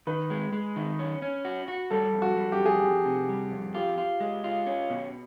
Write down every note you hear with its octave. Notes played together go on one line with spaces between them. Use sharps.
D#3 B4
G#3
G#3
D#3
C#4
C#4
F#4
F#4
G3 A4
F2
F#4
G3
G4
F2
G#4
F2 G4
C3
G3
F2
F4 G4
F4
G#3
F4
C#4
B2